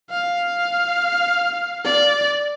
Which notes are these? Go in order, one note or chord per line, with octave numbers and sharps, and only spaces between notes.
F5
D5